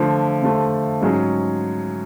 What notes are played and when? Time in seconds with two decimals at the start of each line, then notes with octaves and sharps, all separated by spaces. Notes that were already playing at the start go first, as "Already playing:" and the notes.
Already playing: D3 F3 A3
0.42 D3 F3 A3
1.01 G#2 F#3 C#4 G#4